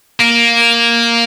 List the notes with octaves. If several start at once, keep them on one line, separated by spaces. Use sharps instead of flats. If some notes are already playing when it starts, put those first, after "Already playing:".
A#3